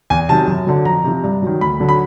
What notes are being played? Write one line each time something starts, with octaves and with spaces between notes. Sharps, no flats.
E2 G#5
C3 D#3 F#3 A5
F#2
D3 F#3
F2 A#5
C3 F3
G2
D#3 F#3
D2 B5
D3 F#3
B5